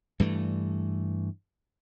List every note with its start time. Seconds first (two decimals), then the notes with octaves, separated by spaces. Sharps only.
0.20 G2 E3 A3